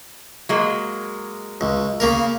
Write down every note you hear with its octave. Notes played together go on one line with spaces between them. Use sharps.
F#3 G#3 A#3
C#2
C#3 A#3 A#4